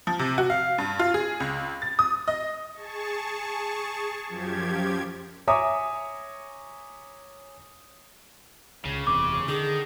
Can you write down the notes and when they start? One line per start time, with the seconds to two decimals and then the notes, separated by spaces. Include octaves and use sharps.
0.07 F3
0.19 C3
0.38 F#4
0.50 F5
0.78 G2
0.99 F4
1.14 G#4
1.40 C#2
1.82 A6
1.99 D#6
2.28 D#5
2.74 G#4 A5 C#6
4.28 F#2 F3 G4 G#6
5.47 C#5 E5 G#5 A#5 D6 D#6
8.85 C#2 C#3
9.07 F#1 E2 C3 D6
9.48 D3 D#3 G#4